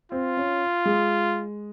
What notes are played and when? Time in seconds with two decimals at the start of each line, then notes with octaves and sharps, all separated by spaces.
0.12 C4 F4
0.37 C#4
0.86 G#3